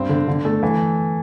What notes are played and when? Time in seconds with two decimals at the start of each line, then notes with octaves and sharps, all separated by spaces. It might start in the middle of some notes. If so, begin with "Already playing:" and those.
Already playing: G2 C4
0.09 D3
0.28 D3
0.45 A3
0.63 E3